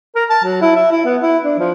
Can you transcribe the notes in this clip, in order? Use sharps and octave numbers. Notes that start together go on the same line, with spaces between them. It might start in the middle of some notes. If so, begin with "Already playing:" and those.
A#4
A5
F#3
E4
E5
E4
B3
E4
D4
F3